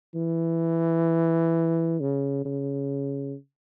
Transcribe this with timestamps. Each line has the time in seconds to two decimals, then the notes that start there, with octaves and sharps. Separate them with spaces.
0.15 E3
2.00 C#3
2.45 C#3